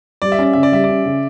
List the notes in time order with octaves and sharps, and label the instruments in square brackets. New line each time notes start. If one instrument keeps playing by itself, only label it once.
[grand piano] G3 [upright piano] D5
[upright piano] E5
[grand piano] C#4 [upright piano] D5
[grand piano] C#3 [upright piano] E5
[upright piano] D5
[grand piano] G3 [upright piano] E5
[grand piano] C#4 [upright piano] D5
[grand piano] C#3